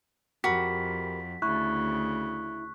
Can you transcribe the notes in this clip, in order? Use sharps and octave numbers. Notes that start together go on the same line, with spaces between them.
F2 F#4 G4 A#4 B5 B6
D2 C#3 E4 C#6 F#6